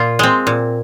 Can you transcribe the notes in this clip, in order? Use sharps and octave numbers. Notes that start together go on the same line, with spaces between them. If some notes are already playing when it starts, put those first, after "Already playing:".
Already playing: A#2 F4
G#3 C4
A#2